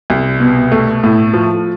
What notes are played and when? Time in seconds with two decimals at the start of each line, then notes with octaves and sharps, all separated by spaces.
0.10 C2
0.40 B2
0.72 A3
1.04 A2
1.34 F3